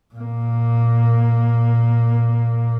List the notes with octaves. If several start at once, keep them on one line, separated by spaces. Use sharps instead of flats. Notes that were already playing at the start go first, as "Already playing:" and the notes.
A#2 A#3